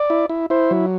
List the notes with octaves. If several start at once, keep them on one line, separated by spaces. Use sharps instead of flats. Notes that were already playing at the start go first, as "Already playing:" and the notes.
Already playing: D5
E4
E4
E4 C5
F#3